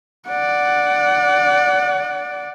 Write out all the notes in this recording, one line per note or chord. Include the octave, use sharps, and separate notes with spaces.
D5 F#5